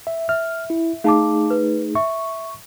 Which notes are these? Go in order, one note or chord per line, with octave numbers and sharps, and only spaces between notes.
E5
E5 F6
E4
A3 D#4 G#4 F5 A5 D6
B4
E5 C#6